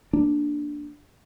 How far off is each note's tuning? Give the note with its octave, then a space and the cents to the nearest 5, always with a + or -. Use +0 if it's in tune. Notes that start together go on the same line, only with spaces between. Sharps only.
A#3 -5 D4 +0